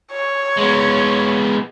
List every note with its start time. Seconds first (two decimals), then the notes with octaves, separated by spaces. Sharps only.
0.12 C#5
0.57 G#3 B3